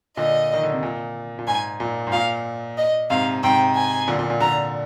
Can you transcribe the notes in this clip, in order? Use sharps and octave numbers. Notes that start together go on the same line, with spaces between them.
A#2 D3 D#5
D#3
D3
C3
A#2
A#2
G#2 G#5
A#2
G#2
A#2 F5
D#5
G#2 C3 F5
G#2 C3 G5
G#5
A#2 D3
A#2
A#2
A#2 D3 A#5